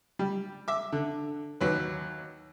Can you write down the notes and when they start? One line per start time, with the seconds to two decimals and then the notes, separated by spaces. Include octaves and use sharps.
0.19 G3
0.68 E5 D6
0.92 D3
1.61 D#2 F#3 B4